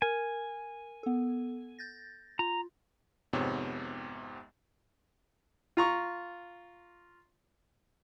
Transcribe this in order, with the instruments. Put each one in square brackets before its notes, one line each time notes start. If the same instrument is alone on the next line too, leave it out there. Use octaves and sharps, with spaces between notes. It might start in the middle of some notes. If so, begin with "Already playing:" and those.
[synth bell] A#4 [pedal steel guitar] G#5
[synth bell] B3 A4
G6 A6 A#6
[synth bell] F4 [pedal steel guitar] A#5
[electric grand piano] G#1 F2 G#2 C3 B3 C#5
[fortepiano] F4 A#5 C#6